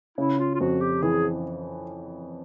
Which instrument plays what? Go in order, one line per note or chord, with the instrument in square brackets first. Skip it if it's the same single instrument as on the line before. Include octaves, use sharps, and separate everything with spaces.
[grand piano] C#3 [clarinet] E4
[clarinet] F4
F4
[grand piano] F2 [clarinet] F#4
[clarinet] G4
[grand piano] E3 [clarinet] G#4